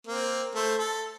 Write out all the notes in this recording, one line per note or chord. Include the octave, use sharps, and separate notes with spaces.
A#3 C4
A3 C5
A4